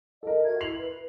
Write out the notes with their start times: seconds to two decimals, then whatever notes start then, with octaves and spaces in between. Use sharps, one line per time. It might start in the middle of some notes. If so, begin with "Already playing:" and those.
0.23 A4 A#4 D#5
0.45 F#4 E5 G#6
0.61 E4 C7 F7 F#7
0.77 B4